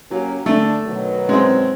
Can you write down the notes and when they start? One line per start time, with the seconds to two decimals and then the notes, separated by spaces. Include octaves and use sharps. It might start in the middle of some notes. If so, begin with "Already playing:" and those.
0.11 F#3 A#3 C#4 G4
0.46 D3 A3 D4
0.86 B2 D#3 F#3
1.29 G#3 C4